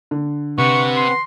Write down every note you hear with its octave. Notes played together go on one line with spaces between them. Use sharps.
D3
C3 B4 F#5 C#6
C6